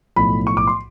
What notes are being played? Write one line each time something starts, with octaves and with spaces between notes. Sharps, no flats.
B1 A2 F3 B5
C#6
D6
C6